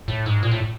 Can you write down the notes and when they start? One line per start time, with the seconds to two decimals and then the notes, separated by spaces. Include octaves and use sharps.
0.08 A2
0.26 G#2
0.43 A#2
0.51 A2